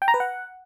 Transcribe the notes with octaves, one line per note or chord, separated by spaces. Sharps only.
G5
A#5
B4
F#5